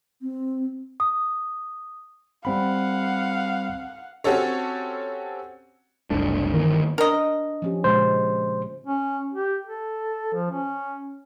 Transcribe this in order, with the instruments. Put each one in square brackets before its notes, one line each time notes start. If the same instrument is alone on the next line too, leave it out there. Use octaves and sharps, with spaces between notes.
[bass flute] C4
[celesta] D#6
[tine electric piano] G3 C4 B5 [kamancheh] F5 F#5
[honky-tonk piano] C4 C#4 F#4 G4 A4 C#5
[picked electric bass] F#1 C2 A3 D4
G1 D#3 E3 A#3
[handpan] D4 [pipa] A#4 D#5
[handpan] F3 C#4 G4
[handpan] A#2 C#3 G#3 [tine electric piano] C5
[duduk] C#4
G4
A4
F3
C#4